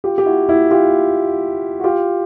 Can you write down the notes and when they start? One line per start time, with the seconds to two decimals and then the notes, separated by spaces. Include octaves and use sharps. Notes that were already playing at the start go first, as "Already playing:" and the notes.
0.04 F4 G4
0.18 G4
0.26 E4 F#4
0.49 E4 F#4
0.71 F4 G4
1.79 F#4
1.84 F4 G4